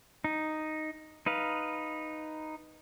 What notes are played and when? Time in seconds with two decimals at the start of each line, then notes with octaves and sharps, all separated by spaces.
0.24 D#4
1.26 D#4 B4 F5